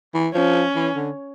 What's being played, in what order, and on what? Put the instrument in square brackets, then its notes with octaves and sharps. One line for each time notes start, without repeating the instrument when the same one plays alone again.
[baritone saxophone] E3
[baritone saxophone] F3 [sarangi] C#4
[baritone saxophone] E3
D3